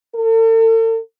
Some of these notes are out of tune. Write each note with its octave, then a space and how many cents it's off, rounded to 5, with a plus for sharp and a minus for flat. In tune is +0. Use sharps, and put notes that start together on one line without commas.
A4 +45